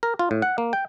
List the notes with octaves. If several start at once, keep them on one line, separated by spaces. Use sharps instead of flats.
A#4
F4
A2
F#5
A#3
G5